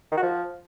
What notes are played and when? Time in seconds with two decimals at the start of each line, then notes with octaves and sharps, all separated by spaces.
0.11 D#3
0.17 F#4
0.22 F3